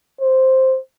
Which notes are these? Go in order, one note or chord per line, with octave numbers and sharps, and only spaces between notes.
C5